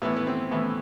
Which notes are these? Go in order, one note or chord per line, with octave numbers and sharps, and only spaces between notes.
A2 E3 B3
B3
C4
A2 E3 B3